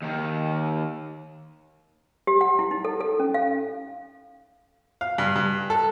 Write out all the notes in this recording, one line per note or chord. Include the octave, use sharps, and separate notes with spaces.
D#2 D#3
G4
F#5
E4
D#4
A4
A4
C#4
F5
F5
G2
G2
A4